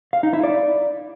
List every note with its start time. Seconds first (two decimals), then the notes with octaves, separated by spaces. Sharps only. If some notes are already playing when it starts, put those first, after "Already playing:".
0.13 F5
0.23 D#4
0.33 E4
0.44 D5